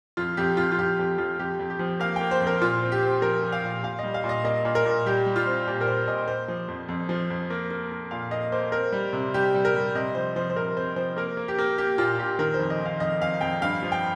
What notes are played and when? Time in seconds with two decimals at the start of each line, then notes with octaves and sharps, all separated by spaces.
0.17 F2 F4
0.37 F2 G4
0.57 F2 F4
0.72 F4
0.78 F2 G4
0.99 F2 G4
1.18 F2 F4
1.39 F2 G4
1.59 F2
1.70 G4
1.79 F3
2.00 A#3 F5
2.16 A#3 G5
2.31 C5
2.40 F2
2.47 A#4
2.61 A#2 F4
2.82 C4
2.92 G4
3.03 C4
3.22 F3 A#4
3.43 F3
3.52 F5
3.64 A#2
3.83 A#2 F5
3.99 G3 D#5
4.14 F5
4.24 A#2
4.29 D#5
4.44 A#3 D#5
4.65 A#2
4.75 A#4
4.85 A#2
5.06 G3 G4
5.26 G3
5.36 F4
5.46 C4
5.68 A#2 G4
5.81 A#4
5.87 C4 C5
6.08 A#2 D#5
6.28 A#3 C5
6.48 F3
6.68 F2
6.89 F2
7.09 F3
7.30 F2
7.50 A#3
7.71 A#3
7.92 A#3
8.11 A#2 F5
8.31 A#3 D#5
8.52 A#3 C5
8.72 C4 A#4
8.92 G3
9.13 C3
9.34 G3 G4
9.54 G3
9.65 A#4
9.75 G3
9.95 C3 D#5
10.15 F3 C5
10.36 F3 C5
10.50 C5
10.56 C3 A#4
10.77 C4 C5
10.96 F3 C5
11.17 A#3 A#4
11.37 A#3
11.48 G4
11.58 A#3
11.78 A#3 G4
11.98 A#2 F4
12.18 A#2 G4
12.39 D#3 A#4
12.54 C5
12.59 F2
12.70 D#5
12.80 D#3
12.86 F5
13.00 F2 D#5
13.20 F2 F5
13.41 F2 G5
13.62 G2 F5
13.83 F3
13.92 G5